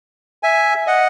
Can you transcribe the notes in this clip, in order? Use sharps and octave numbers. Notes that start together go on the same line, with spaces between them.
E5 G#5
D#5 F#5